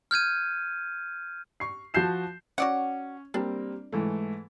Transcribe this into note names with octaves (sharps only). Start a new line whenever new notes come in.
F6 G6 G#6 D#7
C#6 C7
F3 F#4 A5 G6 C7 E7
C#4 F#4 D5 F#5
G3 A#3 C4 D4
G#2 E3 A3